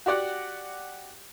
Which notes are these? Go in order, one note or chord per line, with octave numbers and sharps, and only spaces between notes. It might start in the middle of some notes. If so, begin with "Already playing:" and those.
F#4 G4 D5 F#5